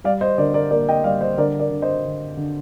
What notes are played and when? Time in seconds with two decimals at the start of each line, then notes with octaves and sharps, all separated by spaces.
0.04 G3 D5 F5
0.21 C5 D#5
0.38 D3 A#4 D5
0.54 A#4 D5
0.71 A#3 A#4 D5
0.89 D#5 G5
1.04 G3 D5 F5
1.21 C5 D#5
1.37 D3 A#4 D5
1.60 A#4 D5
1.70 D3
1.82 C5 D#5
2.05 D3
2.37 D3